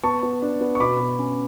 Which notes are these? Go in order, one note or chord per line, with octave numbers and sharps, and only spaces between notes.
B3 A5 C#6
B3
D4
B3
C#6
B2 B5 D6
B2
C#4